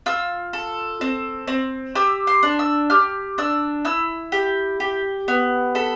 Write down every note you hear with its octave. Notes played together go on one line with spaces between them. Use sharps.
F4 E6
A4
C4
C4
G4 E6
C6
D4
E6
G4 F6
D4 E6
E4 E6
G4
G4
B3
A4 B5